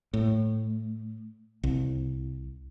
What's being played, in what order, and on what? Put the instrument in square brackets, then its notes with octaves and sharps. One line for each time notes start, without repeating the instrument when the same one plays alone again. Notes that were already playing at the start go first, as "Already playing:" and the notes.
[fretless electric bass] A2
C2